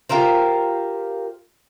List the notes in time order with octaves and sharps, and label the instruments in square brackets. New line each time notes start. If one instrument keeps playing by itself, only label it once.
[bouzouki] F4 G4 A#4 C5